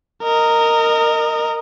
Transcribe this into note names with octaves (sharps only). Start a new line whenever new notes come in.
A#4 D#5